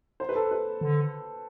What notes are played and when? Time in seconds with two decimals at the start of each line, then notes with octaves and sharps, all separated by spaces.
0.20 C5
0.29 B4
0.35 A4
0.51 B4
0.81 D3